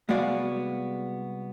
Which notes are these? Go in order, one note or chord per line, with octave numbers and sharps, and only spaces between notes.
C2 G#3 B3 F#4 D5 F5